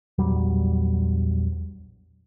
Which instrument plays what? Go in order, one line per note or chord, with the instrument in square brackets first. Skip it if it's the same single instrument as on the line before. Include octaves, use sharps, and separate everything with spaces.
[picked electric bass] A#1 E2 F#3 G3